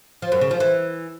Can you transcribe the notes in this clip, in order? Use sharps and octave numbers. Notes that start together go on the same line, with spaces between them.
F3
F#2
C#3
F3
E3